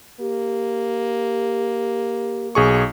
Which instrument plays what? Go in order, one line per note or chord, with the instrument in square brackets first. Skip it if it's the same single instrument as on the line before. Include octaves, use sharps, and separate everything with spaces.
[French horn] A#3 [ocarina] G4
[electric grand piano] B1 G#4 C#6